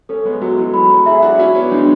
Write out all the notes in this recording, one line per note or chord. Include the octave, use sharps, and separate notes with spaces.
A3 C#4 A4
G#3 B3
F#3 A3 F#4
E3 G#3
F#3 B5
F#3 A3
E4 G#4 E5
D4 F#4
C#4 E4 F#4
B3 D4
E3 G#3 D4